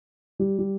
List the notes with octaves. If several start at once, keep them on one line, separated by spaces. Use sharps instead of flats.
G3
G3